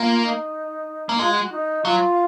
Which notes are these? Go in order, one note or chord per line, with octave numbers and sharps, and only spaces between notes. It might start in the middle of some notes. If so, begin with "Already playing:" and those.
Already playing: A#3 F4
D#4
A#3 D#4
G#3 F4
F#4
F#4
D#4
F#3 F4